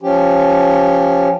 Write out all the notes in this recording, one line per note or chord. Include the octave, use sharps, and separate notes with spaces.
F3 C#4 G4